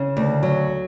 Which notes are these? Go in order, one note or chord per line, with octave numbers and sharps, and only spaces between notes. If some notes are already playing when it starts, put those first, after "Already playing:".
Already playing: C#3
D2
F#3